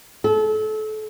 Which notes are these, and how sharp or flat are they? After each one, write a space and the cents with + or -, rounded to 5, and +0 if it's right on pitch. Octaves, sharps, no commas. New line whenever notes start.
A4 -30